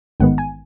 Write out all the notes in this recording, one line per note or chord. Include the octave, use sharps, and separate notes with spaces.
A1 G#2 D#3 G#3 B3 F#5
G#5